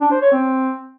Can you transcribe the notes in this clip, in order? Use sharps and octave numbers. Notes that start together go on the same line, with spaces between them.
D4
C5
C#5
C4